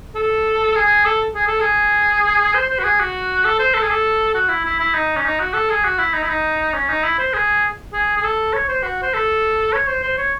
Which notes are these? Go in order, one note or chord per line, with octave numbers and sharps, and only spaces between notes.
A4
G#4
A4
G#4
A4
G#4
C5
C5
F#4
G#4
F#4
A4
C5
A4
G#4
A4
F#4
E4
E4
E4
D#4
C#4
D#4
F#4
A4
G#4
F#4
E4
D#4
E4
D#4
C#4
D#4
E4
C5
G#4
G#4
G#4
A4
C#5
C5
F#4
C5
A4
C#5
C5
C5
C#5